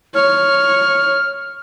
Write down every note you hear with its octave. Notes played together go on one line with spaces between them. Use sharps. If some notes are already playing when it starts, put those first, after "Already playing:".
C#5 F6